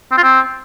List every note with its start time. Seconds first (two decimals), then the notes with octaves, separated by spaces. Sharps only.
0.12 C4
0.17 F4
0.23 C4